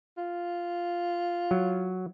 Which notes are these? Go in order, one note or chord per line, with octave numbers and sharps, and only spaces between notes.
F4
F#3